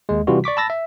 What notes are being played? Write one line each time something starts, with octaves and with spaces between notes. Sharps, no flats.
D#2 G#3
C3 E3 G3 F4 F#4
D5 C#6 D6 B6
A5 B5 E6 A6 A#6
E5